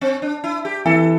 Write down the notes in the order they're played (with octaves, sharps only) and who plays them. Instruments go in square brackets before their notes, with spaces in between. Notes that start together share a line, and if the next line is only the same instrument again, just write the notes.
[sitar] C4
D4
E4
G4
[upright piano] E3 [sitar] A4